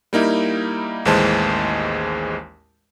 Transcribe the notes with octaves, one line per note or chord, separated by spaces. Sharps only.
G3 A#3 D#4 E4
A1 D#2 E3 G#3 C5 A5